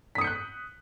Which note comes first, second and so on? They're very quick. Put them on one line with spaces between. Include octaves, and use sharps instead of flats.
B6 D#6 C#7 G6 F#6